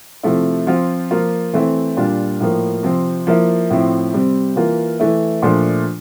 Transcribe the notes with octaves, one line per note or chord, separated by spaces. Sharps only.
C3 F3 A3 E4
F3 C4 F4
F3 A#3 F4
E3 A3 C4 E4
A#2 G3 D4 F4
A2 F3 A#3
C3 F3 C4
F3 A#3 E4
A2 F3 C4 E4
C3 G3 C4
E3 A#3 F4
E3 A3 E4
A#2 F3 A3 D4